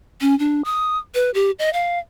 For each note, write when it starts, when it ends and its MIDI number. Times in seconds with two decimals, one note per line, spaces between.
0.21 0.37 61
0.39 0.62 62
0.65 0.98 87
1.15 1.31 71
1.34 1.51 67
1.59 1.72 75
1.73 1.99 77